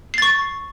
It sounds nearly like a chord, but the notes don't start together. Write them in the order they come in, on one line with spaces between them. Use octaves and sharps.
C7 A6 C#6